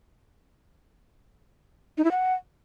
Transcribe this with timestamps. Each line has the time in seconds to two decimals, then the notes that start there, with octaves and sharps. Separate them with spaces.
1.98 D#4
2.04 E4
2.11 F#5